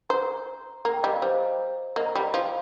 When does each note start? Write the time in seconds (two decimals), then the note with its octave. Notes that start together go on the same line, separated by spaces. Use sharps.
0.09 C5 A#5
0.85 A#3 A#5
0.94 G5
1.03 G3 D#5
1.13 F5
1.22 G3 C5
1.96 A#3 D#5
2.06 A#5
2.15 G3 G5
2.34 F3 F5